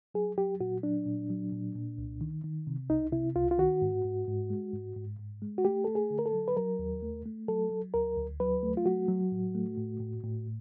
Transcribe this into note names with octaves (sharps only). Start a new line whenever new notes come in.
F#3 G#4
F#3 G4
A#2 F#4
F#3 D4
A#2
F#3
A#2
A#2
C2
D#3
D#3
C3
C2 D#4
C3 E4
C2 F4
F4
D#3 F#4
G#2
G#2
G#2
G#3
G#2
G#2
G#2
G#3
F#4
A3 G4
A3 A4
G#4
D3
A#4
A4
F#3
B4
F#3 A#4
D#2
A3
A3
F#3 A4
F#3
D2 A#4
D2
F#3 B4
A3
F4
F#3 F#4
F#3
A2
A3
A2
A2
A2